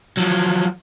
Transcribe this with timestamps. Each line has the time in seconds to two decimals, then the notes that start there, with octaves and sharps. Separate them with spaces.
0.17 F3 F#3